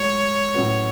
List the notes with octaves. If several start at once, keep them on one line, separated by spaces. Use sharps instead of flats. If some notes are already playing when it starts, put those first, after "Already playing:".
Already playing: G#2 F#3 A3 C#5
A2 F#3 C#4 F#4 B4